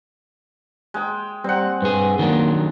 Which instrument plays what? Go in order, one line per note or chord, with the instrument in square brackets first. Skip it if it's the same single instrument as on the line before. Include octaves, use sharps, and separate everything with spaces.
[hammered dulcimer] G#3 G5
[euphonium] G3 [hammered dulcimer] C4 F#5
[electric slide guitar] G2 G#4 [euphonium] B4
[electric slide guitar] D#3 F#3 D4 [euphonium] A#3